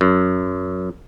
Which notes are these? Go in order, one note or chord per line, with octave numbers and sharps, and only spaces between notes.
F#2